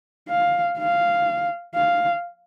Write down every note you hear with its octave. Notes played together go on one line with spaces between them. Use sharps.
F5
F5
F5